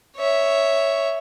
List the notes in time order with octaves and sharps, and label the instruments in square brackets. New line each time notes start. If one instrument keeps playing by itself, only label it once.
[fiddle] C#5 E5